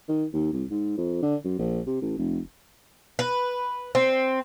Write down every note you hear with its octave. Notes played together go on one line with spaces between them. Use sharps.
D#3
D#2
C2
G#2
F2
D3
F#2
A#1
C3
A1
F1
B4
C4